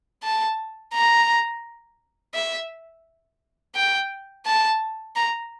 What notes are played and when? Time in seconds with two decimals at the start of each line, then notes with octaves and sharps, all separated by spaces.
0.23 A5
0.94 A#5
2.34 E5
3.75 G5
4.46 A5
5.16 A#5